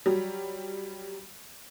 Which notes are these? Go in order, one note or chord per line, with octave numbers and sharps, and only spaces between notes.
F#3 G3